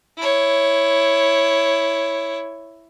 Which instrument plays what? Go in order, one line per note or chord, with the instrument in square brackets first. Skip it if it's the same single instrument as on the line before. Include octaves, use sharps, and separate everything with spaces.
[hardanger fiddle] E4 C#5